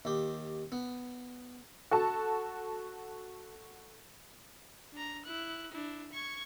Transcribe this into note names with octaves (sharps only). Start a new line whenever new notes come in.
D#2 G4
B3
F#4 A4 A5
D4 A#5
E4 F#6
D4 E4
C#6 G#6